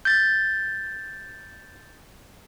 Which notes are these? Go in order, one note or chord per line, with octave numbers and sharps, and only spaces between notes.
G6 A6